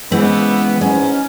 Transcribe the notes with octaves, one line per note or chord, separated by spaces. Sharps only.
C#3 E3 G#3 B3 C4
G#2 C#4